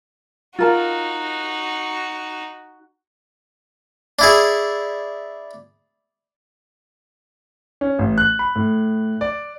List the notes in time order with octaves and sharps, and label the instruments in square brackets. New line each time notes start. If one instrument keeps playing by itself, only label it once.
[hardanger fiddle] D#4 F#4 [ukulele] F4 A#4 A5
[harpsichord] D4 E4 G#4
[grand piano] C#4
A1
F#6
B5
A2
D5